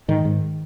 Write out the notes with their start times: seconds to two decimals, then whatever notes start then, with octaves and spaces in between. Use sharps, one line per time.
0.08 G#2 D#3
0.25 G#2